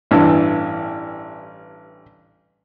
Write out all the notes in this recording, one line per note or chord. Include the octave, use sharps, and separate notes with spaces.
A1 G2 E3